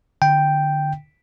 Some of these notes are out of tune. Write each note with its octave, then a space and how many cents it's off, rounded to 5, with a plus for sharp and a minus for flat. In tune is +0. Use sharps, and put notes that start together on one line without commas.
D3 +20 G5 +0